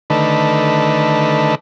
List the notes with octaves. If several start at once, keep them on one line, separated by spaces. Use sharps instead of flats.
D3 D#3 A3 B4